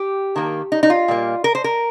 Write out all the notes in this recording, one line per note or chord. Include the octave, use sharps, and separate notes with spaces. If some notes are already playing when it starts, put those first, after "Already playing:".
Already playing: G4
D#3 A#3
D#4
D#4
F4
A#2 G3 A#3
A#4
C5
A#4